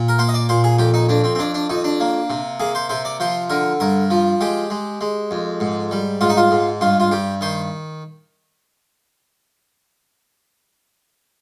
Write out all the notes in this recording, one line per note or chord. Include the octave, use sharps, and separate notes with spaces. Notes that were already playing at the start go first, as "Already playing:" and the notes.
Already playing: A#2
A#4
A#3 C5
D#5
D5
A#2 C5
G#4
F2 G4
D#4
F2 D4
C4
C4
F2 D4
D4
F2 D#4
D4
A#3
C3
A#3 G#4
C5
C3 C5
D5
F3 C5
D3 A#4
G2 A#4
F3
G#3 G4
G#3
G#3
F2
G#2
G3
G#2 F4
D#4
F4
G#2
G2 F4
F4
G2 G4
D#3 C5